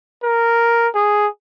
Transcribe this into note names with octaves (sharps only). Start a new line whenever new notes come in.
A#4
G#4